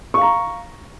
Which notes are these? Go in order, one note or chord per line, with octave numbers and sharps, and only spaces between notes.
F5 A#5 C#6